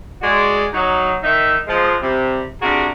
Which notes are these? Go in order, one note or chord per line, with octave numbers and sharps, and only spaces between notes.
G#3 F#4 D5
F#3 D#4
D#3 D#4 E5
F3 G#3
C3 G3
C3 D4 F#4 G#4 A#4